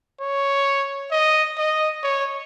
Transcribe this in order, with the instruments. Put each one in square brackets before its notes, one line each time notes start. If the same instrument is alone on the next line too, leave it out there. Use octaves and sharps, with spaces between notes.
[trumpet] C#5
D#5
D#5
C#5